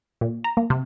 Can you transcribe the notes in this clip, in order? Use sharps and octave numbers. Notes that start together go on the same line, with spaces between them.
A#2
A#5
A#3
C3